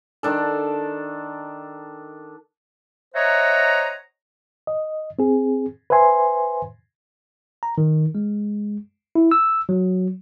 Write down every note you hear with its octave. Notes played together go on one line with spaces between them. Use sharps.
D#3 D4 A4
C5 C#5 D#5 E5 F#5 A#5
D#5
C4 G#4
B4 C5 E5 G#5 C6
A#5
D#3
G#3
E4
E6
F#3